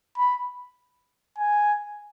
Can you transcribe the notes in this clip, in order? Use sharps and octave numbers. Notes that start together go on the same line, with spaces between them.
B5
G#5